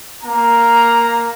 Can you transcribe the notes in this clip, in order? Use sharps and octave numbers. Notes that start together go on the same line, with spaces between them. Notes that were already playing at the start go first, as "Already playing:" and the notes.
A#3 A#5